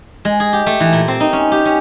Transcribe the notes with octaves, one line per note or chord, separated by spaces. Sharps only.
G#3
G#4
G4
A3
E3
A#2
C4
D#4
C#4
G4
C#4